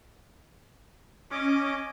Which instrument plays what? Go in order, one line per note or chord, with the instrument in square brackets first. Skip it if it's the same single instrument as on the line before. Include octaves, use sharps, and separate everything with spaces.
[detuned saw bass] C#4 [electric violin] D#5 D6